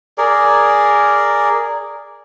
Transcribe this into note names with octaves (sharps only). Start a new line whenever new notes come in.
G#4 A#4 D5